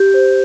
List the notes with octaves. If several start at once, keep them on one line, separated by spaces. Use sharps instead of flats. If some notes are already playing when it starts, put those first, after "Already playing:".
Already playing: G4 G6
C5